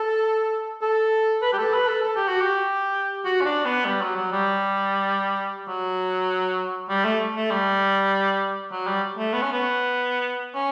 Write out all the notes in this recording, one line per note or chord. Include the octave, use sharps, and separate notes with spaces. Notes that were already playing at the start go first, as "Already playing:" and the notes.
Already playing: A4
A4
B4
G4
A4
B4
A4
A4
G4
F#4
G4
F#4
C#4
D4
B3
G3
F#3
F#3
G3
F#3
G3
A3
A3
G3
F#3
G3
A3
B3
C#4
B3
C#4